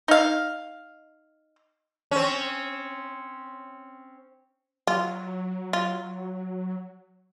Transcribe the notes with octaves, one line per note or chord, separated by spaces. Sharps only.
D#4 F5
C4 C#4
F#3 F4
F4